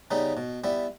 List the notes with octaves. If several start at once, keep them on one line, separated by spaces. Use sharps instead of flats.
C#3 G3 B3 D#4
B2
G3 B3 E4